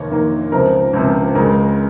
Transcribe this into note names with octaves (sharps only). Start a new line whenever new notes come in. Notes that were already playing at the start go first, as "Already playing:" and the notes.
Already playing: F1 D#2 D#3 A#3 C#5
F1 D#2 D#3 A#3
C#2 C3 F3 A#4
C#2 C3 F3
C#2 C#3 G#3 A#4